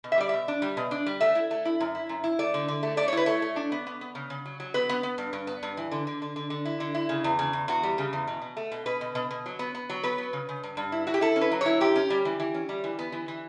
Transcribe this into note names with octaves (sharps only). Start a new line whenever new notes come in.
B2
E5
G3 D5
B2 E5
D4
G3
B2
D4
G3
A3 E5
E4
A3
E4
F#2
E4
F#2
E4
A3 D5
D3
D3
A3
A3 D5
C#5
E4 B4
A3 C#5
A3
D4
B3
B3
B3
C#3
C#3
F#3
F#3
B3 B4
B3
B3
G2
G2
B3
G2
E3
D3
D3
D3
D3
D3
E4
D3
E4
C#3
E2
C#3
E2
E2 F#4
G3
C#3
E2
B2
B2
A3
B2
B2 B4
B2
B2
B2
F#3
B3
B3
F#3
B3 B4
F#3
C#3
C#3
G2
G2
E4
E4 F#4
G4
E4 A4
C#4
B4
F#3
E4 C#5
F#2 G4
C#4
G3
E3
E3
C#4
G3
E3
B3
E3
E3